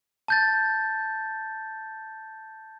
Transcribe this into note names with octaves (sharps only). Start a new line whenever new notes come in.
A5 G6 A6